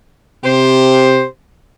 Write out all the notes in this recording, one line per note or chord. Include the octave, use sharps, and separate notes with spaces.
C3 G4 C5